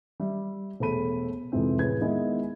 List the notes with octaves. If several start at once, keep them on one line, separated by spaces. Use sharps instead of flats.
G3 E5
E1 A3 G#4 A4 B5 D#7
F2 G#2 C3 E3 C4
A1 G#4 B4 G#6
D#3 G#3 B3 E4 B4 D#5